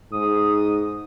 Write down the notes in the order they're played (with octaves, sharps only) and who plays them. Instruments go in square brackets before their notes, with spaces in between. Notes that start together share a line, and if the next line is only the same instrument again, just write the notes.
[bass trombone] G#2 [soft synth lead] D#6